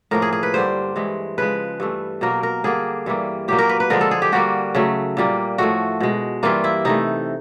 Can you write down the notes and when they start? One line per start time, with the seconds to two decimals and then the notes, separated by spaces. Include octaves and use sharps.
0.11 A2 F3 A#3 A#4
0.22 G#4
0.33 G#4
0.43 B4
0.54 G2 D3 G3 C5
0.96 G2 E3 G#3
1.38 C#3 F3 G#3 B4
1.80 G2 E3 A3
2.21 B2 F#3 A#3 A#4
2.43 A#4
2.64 D3 G3 A#3 G#4
3.06 G2 E3 G3 A#3
3.48 A#2 F#3 A#3 G4
3.59 A#4
3.69 B4
3.80 B4
3.90 D3 F3 G#3 A#4
4.01 A4
4.11 G#4
4.22 G4
4.32 D3 G3 A#3 F#4
4.75 C#3 F#3 A3
5.17 A#2 G3 A#3
5.58 A2 F3 A3 F#4
6.00 B2 G#3
6.43 G2 E3 G3 A#3 F4
6.64 E4
6.85 C3 E3 A3 D#4